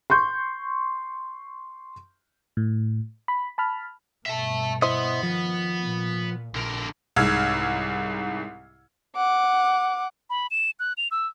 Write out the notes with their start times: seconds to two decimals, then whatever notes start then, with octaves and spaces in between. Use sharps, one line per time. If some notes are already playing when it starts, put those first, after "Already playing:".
0.10 C6 C#6 G6
2.57 A2
3.28 B5
3.58 A5 B5 F6
4.26 G2 B2 E5 A5
4.82 B3 E4 C5 D#5
5.23 D#3 F3
5.81 A#2
6.55 A#1 D3 A#4
7.16 C2 G#2 E6 F6 G#6
9.17 F#5 D6
10.30 B5
10.51 E7
10.80 F#6
10.97 F7
11.11 E6